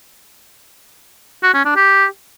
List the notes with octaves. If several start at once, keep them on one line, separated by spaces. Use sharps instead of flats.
F#4
C#4
D4
G4